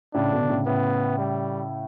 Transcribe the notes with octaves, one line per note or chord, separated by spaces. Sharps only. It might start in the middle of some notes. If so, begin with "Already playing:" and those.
A2 C#3 D4
B2 D3
A2 C#3
A2 C#3 B3
G3